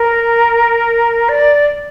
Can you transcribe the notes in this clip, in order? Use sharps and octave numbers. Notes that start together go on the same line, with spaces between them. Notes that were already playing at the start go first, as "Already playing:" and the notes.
Already playing: A#4
D5